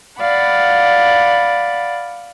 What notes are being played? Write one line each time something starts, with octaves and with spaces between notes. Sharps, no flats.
D5 F5 F#5 B5